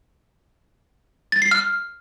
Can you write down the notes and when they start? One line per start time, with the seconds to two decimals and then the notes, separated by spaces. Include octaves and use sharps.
1.32 A6
1.42 C7
1.51 F6